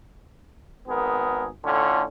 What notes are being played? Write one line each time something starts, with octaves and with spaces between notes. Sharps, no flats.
G#1 B3 G#4 A#4
A2 D3 C#4 F4